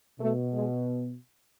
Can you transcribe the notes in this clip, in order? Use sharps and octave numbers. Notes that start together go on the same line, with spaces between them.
B2 A3
G#3